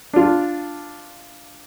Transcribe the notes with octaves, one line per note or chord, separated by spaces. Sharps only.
D4 F4